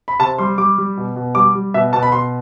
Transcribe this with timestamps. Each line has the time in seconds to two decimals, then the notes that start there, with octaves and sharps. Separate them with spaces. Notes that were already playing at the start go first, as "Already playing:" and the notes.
0.08 B5
0.20 C3 A5
0.38 G3 C6
0.58 G3 D6
0.78 G3
0.97 B2
1.16 B2
1.35 G3 D6
1.55 G3
1.74 B2 E5
1.93 B2 A5
2.03 B5
2.12 B2 C6